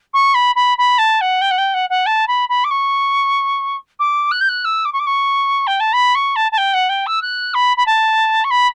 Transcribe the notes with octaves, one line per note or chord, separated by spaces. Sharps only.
C#6
B5
B5
B5
A5
F#5
G5
F#5
G5
F#5
F#5
A5
B5
B5
D6
C#6
D6
F#6
G6
F#6
E6
D6
C#6
D6
C#6
G5
A5
B5
C#6
A5
A5
G5
F#5
G5
E6
F#6
B5
B5
A5
C#6
B5